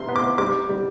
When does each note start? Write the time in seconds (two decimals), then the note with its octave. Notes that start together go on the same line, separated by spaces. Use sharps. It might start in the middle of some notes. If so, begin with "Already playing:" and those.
Already playing: G3 C6
0.09 B3
0.16 D6
0.38 G3 D6
0.69 G3